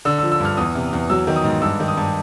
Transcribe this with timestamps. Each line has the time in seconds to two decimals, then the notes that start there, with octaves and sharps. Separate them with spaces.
0.05 D3 E6
0.18 E6
0.23 F3
0.32 E6
0.40 G2 F6
0.57 E2 D#6
0.75 C3
0.93 E2
1.10 F#3 E6
1.27 D#3
1.36 D#6
1.44 G#2
1.62 G2 E6
1.80 D#3
1.88 D#6
1.97 G2